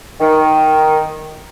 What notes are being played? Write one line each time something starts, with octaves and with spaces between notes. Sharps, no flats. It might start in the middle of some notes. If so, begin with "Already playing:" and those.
D#3